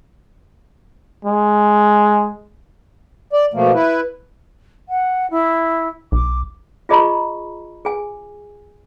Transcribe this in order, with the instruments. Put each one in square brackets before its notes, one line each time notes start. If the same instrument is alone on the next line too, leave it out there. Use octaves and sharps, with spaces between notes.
[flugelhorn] G#3
[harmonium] D5
B2 F3 A3 A#3
E4 B4
[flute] F#5
E4
[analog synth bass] B1 [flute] D6
[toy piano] F4 G#4 D#5 A#5 B5 C#6
G#4 G#5